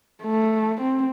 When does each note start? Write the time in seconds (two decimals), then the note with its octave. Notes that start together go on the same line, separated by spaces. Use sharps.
0.23 A3
0.81 C4